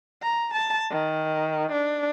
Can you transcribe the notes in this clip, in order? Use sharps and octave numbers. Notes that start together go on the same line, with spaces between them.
A#5
A5
D#3
D4